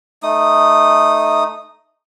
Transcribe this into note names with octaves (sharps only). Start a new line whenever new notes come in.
A3 D#4 D#6